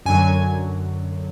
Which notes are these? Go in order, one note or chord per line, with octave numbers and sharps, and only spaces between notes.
F#2 D3 F#3 G#5